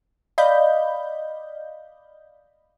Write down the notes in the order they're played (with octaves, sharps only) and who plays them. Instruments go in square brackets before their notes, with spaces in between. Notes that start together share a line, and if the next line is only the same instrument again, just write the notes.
[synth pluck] D5 D#5 F5 B5 G6